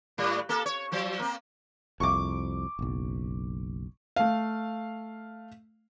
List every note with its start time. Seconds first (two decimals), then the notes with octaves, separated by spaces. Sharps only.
0.18 A2 G3
0.49 A#3 A4
0.66 C#5
0.92 F3 F#3 C5
1.19 A#3 C4
2.00 C2 F2 C#6 D6
2.79 F#1 B1
4.16 A3 F5